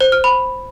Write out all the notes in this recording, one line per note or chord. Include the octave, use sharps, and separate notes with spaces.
C5
F6
B5